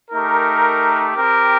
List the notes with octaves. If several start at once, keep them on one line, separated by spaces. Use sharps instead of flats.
A3 D#4 G4 A#4
C4 G4 A#4